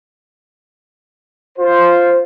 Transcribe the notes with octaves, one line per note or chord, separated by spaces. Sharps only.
F4 C5